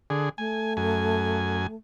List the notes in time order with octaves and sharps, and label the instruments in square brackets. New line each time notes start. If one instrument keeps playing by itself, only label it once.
[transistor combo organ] D3 G#4
[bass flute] A3 [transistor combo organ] G#5
[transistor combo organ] F#2 G#5